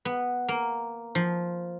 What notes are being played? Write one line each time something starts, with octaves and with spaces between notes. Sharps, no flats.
B3
A#3
F3